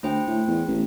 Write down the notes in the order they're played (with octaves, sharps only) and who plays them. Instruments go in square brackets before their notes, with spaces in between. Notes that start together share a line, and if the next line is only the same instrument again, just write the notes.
[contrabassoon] D2 [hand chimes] A3 C5 G5
[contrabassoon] A2
E2
A1